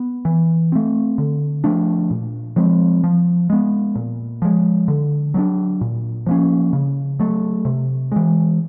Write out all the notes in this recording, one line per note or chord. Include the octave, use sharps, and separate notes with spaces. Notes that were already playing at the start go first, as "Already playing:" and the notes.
Already playing: B3
E3
A3 C4
D3
F3 A3 D4
A#2
F3 G#3 C4
F3
G#3 B3
A#2
F3 G#3
D3
F#3 B3 D4
A#2
F3 A#3 C#4
C#3
F#3 A3
C3
E3 G#3